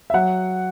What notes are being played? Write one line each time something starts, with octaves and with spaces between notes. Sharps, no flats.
E5
F#3 F#5